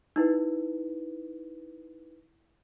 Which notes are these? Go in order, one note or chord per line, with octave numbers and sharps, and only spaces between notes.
D#4 E4 B4